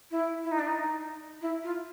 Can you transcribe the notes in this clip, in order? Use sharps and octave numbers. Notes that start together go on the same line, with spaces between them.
E4
E4
D#4
D4
D#4
E4
F4